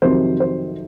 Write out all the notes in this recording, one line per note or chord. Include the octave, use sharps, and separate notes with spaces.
F2 C3 D#3 F#3 C5
C5